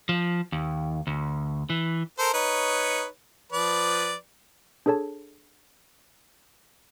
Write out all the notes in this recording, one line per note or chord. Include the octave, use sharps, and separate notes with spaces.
F3
D#2
D2
E3
A4 A#4 C5
D#4 B4 C#5
F3 B4 D5
D4 G#4 A4 C#5 A5